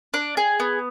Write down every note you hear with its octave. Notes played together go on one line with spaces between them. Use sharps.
D4
G#4
B3